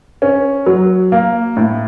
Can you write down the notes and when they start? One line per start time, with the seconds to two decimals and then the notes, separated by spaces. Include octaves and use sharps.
0.22 C#4
0.66 F#3
1.12 A#3
1.57 A2